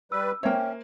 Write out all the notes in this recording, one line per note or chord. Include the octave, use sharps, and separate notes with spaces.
G3 B4 E6
A#3 C#4 C5 C#5 E5 G5 F6